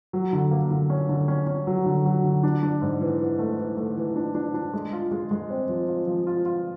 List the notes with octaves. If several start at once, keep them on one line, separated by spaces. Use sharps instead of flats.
F#3
D3
A#3
D3
C#4
D3
C#4
C#4
F#3
D3
F#3
D3
D4
D4
G#2
E3
E3
A3
E3
A3
E3
D4
D4
D4
G#3
F4
G#3
G#3
C4
F3
F4
F3
F4
F4